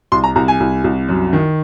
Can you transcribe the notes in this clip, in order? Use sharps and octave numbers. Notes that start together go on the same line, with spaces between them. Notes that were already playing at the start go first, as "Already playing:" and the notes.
C2 C6
A#5
C2 A#5
G#5
C2
C2
F#2
D#3